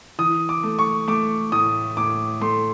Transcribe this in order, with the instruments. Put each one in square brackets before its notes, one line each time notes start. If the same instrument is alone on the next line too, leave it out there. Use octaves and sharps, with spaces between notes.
[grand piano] E3 D#6
D6
A3
C#6
A3 D6
A2 D#6
A2 D6
A3 C6